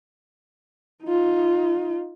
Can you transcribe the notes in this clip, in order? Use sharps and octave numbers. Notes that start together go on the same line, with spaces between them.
D#4 F4